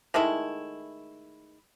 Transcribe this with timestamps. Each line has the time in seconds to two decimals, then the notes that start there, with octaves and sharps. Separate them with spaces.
0.14 D#3 G#3 A3 E4